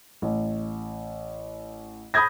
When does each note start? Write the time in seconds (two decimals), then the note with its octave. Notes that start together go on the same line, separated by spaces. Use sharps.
0.22 A1
2.14 B5 D#6 G6 G#6 A#6